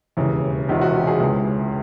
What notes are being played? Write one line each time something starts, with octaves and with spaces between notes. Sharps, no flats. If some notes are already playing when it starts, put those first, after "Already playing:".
E1 D#2 C#3 E3
E1 E2 C3 D#3 F4
F#4
G4
G#4
C#2 C#3 E3